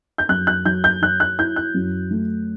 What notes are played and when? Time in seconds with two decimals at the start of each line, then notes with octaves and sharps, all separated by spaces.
0.18 G6
0.29 F#2 F#6
0.47 F#6
0.65 F#3 G6
0.84 G6
1.02 F#3 F#6
1.20 F#6
1.39 E4 G6
1.56 F#6
1.74 F#2
2.11 A3